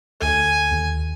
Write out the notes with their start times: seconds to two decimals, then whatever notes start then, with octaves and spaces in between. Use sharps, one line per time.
0.21 D2 A4 G#5
0.71 D#2